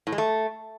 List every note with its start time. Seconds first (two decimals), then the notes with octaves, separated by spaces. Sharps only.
0.07 A2
0.12 G#3
0.18 A3